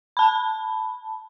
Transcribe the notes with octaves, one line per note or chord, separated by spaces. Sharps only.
A5 B5